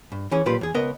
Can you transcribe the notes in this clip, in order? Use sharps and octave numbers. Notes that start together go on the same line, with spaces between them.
G2
E3 C#4 G#4
B1 A#2 F4 G4 B4
E2 G#4
C#2 B3 A#4 D#5